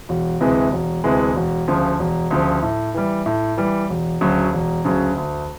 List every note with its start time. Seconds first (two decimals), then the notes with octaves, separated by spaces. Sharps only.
0.09 E1
0.41 D2 C3 E3 G#3
0.72 E1
1.04 D2 C3 E3 G#3
1.36 E1
1.68 D2 C#3 F3
1.99 E1
2.31 D2 C#3 F3
2.62 A2
2.94 E3 G3
3.26 A2
3.57 E3 G3
3.89 E1
4.21 D2 C#3 F#3
4.53 E1
4.84 D2 C#3 F#3
5.16 D2